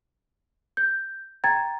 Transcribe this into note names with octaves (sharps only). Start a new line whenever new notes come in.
G6
G5 A#5 G#6 A6